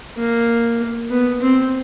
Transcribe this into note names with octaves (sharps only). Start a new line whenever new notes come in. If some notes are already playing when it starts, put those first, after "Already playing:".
A#3
B3
C4